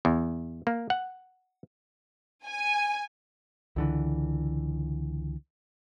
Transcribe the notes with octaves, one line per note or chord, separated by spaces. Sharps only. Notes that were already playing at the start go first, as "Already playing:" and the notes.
E2
A#3
F#5
G#5
C#2 D3 E3